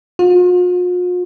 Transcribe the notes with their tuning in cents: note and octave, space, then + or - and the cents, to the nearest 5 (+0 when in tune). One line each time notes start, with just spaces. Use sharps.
F4 +45